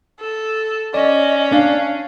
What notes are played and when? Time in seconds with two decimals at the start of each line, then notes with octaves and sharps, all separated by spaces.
0.20 A4
0.94 C#4 D5 D#5
1.52 D4 F5